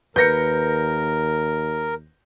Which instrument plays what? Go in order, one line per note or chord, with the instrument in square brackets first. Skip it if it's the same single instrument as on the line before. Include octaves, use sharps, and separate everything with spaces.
[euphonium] D#2 [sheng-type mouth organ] A#4 [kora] B4 [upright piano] G6 A#6 C#7